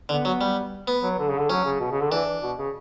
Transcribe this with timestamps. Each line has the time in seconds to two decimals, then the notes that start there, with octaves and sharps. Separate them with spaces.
0.09 D3 B3
0.25 F#3
0.41 G3
0.88 B3
1.03 F#3
1.19 D3
1.29 C#3
1.39 D3
1.50 F#3 C#4
1.65 C#3
1.80 B2
1.91 C#3
2.02 D3
2.12 E3 D4
2.43 B2
2.58 C#3